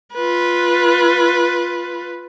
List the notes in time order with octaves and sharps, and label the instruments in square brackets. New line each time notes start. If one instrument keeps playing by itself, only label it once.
[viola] F4 B4